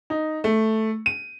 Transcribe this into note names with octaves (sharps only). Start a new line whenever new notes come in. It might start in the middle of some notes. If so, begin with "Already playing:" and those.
D#4
A3
D#7